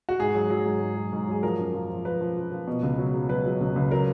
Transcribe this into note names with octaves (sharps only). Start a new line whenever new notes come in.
F#4
G#2 G#4
F#3
F#3
G#2
G#2
F#3
G#2
F#3 G#4
F3 A#4
F#2
F3
F3
F3 B4
F3
F3
F3
B2
C#2
F#3
F#3
F#3 B4
F#3
C#2
C#2
F#3 A#4